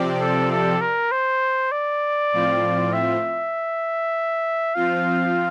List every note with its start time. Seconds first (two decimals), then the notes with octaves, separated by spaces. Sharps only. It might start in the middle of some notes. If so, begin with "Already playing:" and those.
Already playing: C3 F3 C4 G4 D5
0.20 A4
0.51 A4
0.81 A#4
1.12 C5
1.72 D5
2.32 A2 F3 C4 F4
2.93 E5
4.75 F3 C4 F4 F5